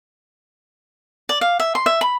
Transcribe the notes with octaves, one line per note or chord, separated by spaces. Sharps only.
D5
F5
E5
C6
E5
B5